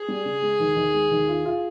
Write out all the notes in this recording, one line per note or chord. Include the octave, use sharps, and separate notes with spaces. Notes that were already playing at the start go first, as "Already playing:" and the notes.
Already playing: G#4
G3
C#3
G#3
D#2
D#2
G#3
D#2
F4
F4